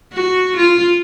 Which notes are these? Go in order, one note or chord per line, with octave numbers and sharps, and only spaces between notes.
F#4
F4